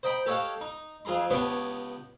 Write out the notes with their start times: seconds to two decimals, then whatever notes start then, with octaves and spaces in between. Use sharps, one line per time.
0.03 C5 D#5 G5 A#5 B5
0.26 G4 A4 C#5 D#5 F5 F#5
0.61 D#4
1.05 F2 F4 G#4 A#5 C6
1.30 C#2 B3 D4 G4 C#5 D#6